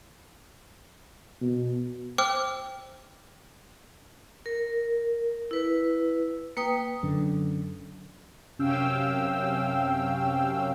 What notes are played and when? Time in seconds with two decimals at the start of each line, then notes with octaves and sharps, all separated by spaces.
1.42 B2
2.18 C5 G5 D6 E6 F6
4.46 A#4
5.51 E4 B4
6.57 A#3 B4 G5 D#6
7.03 F#2 D3
8.59 F#2 C3 C#4 F5 G5 E6